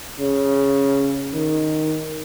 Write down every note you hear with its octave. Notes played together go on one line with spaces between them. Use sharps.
C#3
D#3